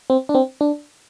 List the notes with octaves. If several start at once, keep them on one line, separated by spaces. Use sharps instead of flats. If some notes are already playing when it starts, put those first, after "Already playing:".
C4
D4
C4
D4